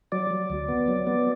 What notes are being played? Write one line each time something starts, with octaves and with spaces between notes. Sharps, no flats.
F#3 D5
F#3
D2
B3
F#3
B3